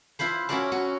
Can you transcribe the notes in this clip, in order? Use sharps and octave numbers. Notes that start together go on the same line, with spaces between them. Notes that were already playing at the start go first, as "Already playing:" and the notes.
E4 F4 B4 C5
C#4 E4 F#4 A#4 D5 A5
C#4 F#4